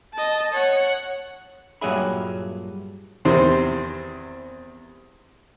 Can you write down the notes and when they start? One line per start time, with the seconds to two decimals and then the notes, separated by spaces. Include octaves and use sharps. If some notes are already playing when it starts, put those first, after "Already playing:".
0.14 D#5 A5
0.53 C#5 F#5
1.81 G2 A#2 F#3 G#4 E5 B5
3.25 E2 C3 D#3 C4 C6